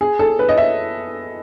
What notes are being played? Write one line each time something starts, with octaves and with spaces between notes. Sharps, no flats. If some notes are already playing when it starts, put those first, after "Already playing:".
G#4
A4
B4
D#5
E5